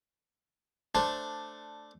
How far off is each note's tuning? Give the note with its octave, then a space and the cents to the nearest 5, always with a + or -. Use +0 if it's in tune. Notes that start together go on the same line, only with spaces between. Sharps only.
A3 +0 D4 +0 C5 +0